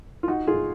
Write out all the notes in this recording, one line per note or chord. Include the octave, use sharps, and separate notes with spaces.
F4
D#4 F#4
F4 G#4